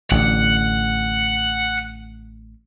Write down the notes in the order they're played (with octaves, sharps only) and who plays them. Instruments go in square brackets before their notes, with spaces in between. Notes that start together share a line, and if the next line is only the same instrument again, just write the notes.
[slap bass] A1 D3 [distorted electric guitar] F#5